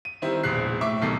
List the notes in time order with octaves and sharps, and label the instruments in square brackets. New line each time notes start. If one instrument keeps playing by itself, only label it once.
[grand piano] D#7
D#3 G3 C4 E4
E1 A#1 F#6 C7
A2 E5 C#6 D6
D#1 B1 D#3 A4 C7